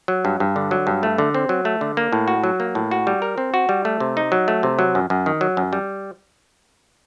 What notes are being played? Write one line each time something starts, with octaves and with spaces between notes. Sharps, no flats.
F#3
G2
G2
D3
F#3
G2
A3
D3
C4
F#3
A3
D3
A#3
A2
F#4
F#3
A#3
A2
F#4
G3
A#4
C4
F#4
G3
A3
C3
D#4
F#3
A3
C3
F#3
F#2
F#2
D#3
F#3
F#2
G3